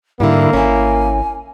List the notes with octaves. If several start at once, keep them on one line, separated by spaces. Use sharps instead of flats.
G#2 D3 G3 A#3 E4
G#1 C#4 E4 G#5